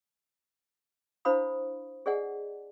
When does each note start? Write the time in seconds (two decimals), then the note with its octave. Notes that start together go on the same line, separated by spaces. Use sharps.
1.25 D4 E4 C5 F5 B5 D#6
2.06 G#4 A4 D5 D#5 F#5 G#5